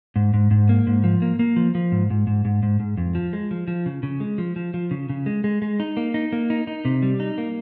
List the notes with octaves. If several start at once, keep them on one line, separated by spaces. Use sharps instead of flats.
G#2
G#2
G#2
A#3
G#2
F3
A#3
A#3
F3
F3
G#2
G#2
G#2
G#2
G#2
G#2
F2
F3
G#3
F3
F3
C#3
C#3
G#3
F3
F3
F3
C#3
C#3
G#3
G#3
G#3
D#4
A#3
D#4
A#3
D#4
D#4
C3
G3
D#4
A#3